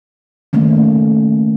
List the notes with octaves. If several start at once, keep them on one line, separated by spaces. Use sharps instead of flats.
D#3 A3 A#3 C#4